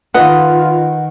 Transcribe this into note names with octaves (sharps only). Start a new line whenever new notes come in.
D#3 F4 B4 D#5 F#5